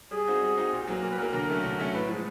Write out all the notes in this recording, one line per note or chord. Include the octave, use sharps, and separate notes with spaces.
G3 G#4
C4 D#4 F#4
G3
C4 D#4 F#4
A#2
F#3 A#3
A#2 A#4
B4
F#3 A#3 A#4
D3 A#4
F#3 A3 C#4
D3
F#3 A3 C#4
A2 B4
F3 G#3 B4